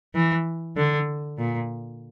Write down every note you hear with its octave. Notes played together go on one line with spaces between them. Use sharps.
E3
D3
A#2